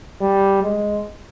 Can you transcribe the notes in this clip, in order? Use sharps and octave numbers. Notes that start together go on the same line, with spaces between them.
G3
G#3